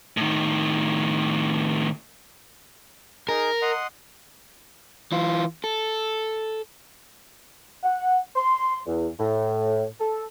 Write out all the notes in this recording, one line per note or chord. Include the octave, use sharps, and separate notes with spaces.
A2 D#3
D#4 G#4 A#4
D#5 F#5 C6
E3 F4
A4
F#5
C6
E2
A2
A4